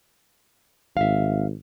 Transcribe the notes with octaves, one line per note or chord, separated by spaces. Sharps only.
G#1 E5 F5